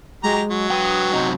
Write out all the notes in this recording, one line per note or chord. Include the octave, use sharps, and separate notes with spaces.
F#3 G#3 G4 A#5
F#3
B4 G5 D#6
F#2 C3 D#4